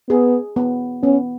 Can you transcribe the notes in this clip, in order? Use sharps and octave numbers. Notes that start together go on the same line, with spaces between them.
B3 G#4
B3
B3 C#4